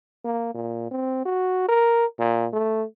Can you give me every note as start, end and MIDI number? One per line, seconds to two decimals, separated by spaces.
0.25 0.50 58
0.54 0.90 46
0.91 1.23 60
1.26 1.66 66
1.69 2.06 70
2.19 2.47 46
2.53 2.84 57